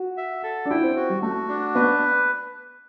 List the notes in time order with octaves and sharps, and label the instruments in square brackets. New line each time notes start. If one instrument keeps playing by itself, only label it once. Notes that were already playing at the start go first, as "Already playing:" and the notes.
Already playing: [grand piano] F#4
[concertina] E5
A4
[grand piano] D4
[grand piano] E4 [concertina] G5
[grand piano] C4
[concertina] F#4
[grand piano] G3
[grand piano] A3 [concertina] F#4
[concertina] D4
[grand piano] B3 [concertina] B4